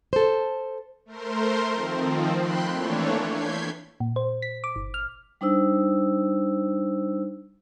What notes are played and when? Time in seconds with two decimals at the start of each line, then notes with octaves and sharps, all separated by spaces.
0.13 A4 C5
1.05 A3 A#4 C5 C6
1.70 D#3 F3 C4
2.38 G5 B5 C6 F#6
2.72 E3 A3 A#3 D4 C#5
3.27 G6 G#6 B6 C7
4.00 A#2
4.16 C5
4.42 B6
4.64 D6
4.76 G1
4.94 F6
5.41 G3 D4 D#4 C5 E6